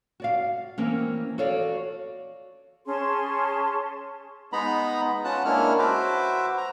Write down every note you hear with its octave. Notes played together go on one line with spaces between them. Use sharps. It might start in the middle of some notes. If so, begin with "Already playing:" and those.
F#4 D5 F5
E3 A#3 C4 C#4
F#4 A4 C#5 D5 F5
C#4 G#4 A5 C6
G#3 B3 D#4 A#5 B5
C#4 F4 B4 F#5 A5 F#6
G#3 A#3 C#4 D4 E4 F6
F#4 B4 C5 E5 D6
A#5